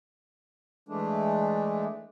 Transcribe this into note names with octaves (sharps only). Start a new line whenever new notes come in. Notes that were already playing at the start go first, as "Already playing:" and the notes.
E3 G#3 A3 D4